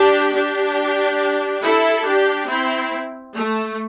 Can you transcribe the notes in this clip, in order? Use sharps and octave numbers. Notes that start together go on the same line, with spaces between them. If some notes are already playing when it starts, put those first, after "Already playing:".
Already playing: D4 G4
D4 G4
E4 A4
D4 G4
C4 E4
A3